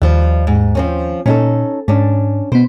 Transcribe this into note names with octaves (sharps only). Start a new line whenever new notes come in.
D#2 F3 G3
G#2
F3 C4 C#4
A#2 C#4 D#4 A4
G#2 C#4 D4
B2 B3 C5